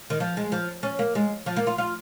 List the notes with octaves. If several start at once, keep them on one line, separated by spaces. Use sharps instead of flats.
D#3
F3
G#3
F3
C#4
A#3
G#3
F3
A#3
F4
F4